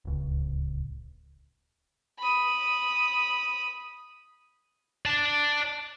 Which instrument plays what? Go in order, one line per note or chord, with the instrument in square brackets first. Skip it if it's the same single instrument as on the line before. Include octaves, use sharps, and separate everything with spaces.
[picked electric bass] D1 C#2
[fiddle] B5 D#6
[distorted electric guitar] D5 A5